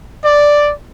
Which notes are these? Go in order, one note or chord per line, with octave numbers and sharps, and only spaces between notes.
D5